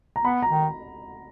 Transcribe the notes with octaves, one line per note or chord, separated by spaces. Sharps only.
A#5
B3 B5
A#5
D#3